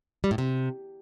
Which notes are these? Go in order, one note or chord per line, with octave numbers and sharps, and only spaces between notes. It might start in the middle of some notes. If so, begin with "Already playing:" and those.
G3
A2
C3